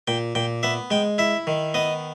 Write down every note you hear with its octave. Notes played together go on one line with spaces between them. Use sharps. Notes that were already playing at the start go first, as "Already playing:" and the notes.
A#2 G5
A#2 G5
B3 E5
G#3 G5
E4 E5
D#3
B3 D#5